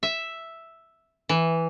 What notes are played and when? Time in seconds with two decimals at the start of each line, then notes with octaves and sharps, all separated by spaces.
0.03 E5
1.29 E3